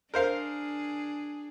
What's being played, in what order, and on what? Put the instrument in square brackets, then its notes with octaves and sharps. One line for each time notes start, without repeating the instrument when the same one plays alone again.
[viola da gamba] D4 G#4 [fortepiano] A#4 C5 F5